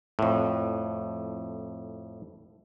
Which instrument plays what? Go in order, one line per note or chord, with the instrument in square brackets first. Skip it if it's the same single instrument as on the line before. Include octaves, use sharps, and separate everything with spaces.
[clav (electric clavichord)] F2 A2